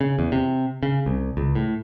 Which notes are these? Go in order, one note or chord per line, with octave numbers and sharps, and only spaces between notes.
C#3
E2
C3
C#3
C2
C#2
A2